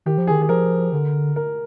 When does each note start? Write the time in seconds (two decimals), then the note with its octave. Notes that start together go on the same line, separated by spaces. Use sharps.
0.06 D#3 G4
0.18 F3
0.27 D#3 G#4
0.40 D#3 G#4
0.49 F3 A#4
0.93 D3
1.36 A#4